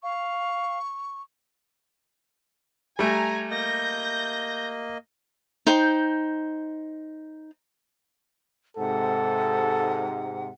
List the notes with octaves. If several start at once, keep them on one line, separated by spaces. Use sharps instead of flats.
F5 C#6
G3 A3 G#5 A#5
A#3 D#5 G6 A#6
D#4 C5 G5
G#2 C3 A4 F#5